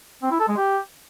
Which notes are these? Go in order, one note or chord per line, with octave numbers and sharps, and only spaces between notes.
C4
E4
A4
G#3
G4